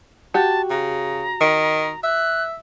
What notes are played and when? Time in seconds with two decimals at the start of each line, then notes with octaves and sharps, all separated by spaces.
0.34 F#4 G4 A5
0.70 C#3 A#5
1.41 D#3
2.03 E5 F#6